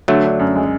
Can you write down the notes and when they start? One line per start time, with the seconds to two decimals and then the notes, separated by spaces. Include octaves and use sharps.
0.08 D3 F#3 A3
0.24 D4
0.40 F#2
0.56 G#3